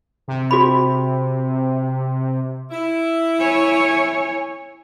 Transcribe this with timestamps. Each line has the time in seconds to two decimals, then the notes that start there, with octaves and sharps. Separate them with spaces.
0.28 C3
0.51 F#4 G#4 B5
2.71 E4
3.40 C#5 G#5